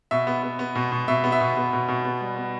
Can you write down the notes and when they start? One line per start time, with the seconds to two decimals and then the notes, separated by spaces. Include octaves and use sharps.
0.11 B2 E5
0.27 B3
0.43 B3
0.59 B3
0.75 B2
0.92 B2
1.08 B2 E5
1.24 B3
1.32 E5
1.41 B2
1.57 B3
1.73 B2
1.88 B2
2.05 B3
2.21 G3
2.36 B3